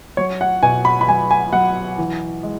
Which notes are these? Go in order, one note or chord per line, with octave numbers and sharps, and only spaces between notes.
F#3 C#5
F#5
B2 G#5
B5
B5
F#3 G#5
G#5
F#3 F#5
E3
G#3